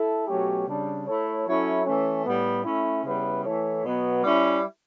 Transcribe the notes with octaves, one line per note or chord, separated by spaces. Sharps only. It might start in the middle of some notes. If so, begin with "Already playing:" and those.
Already playing: E4 A4
B2 F#3 A3 C#4 G4
C#3 G3 D4
A3 E4 A4 C#5
F#3 C#4 E4 A4 C#5
E3 A3 C#4
A2 G3 B3
A3 C#4 E4
C#3 G3 B3 E4 B4
E3 A3 E4 A4 C#5
B2 F#3 B3
G3 C#4 E4